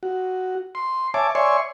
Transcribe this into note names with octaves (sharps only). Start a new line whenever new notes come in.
F#4
C6
C#5 E5 G#5 A5 D6
C#5 D5 E5 G#5 C6 C#6